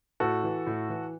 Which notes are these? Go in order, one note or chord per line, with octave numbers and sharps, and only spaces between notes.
A2 F#4 A4
E3
A2
E3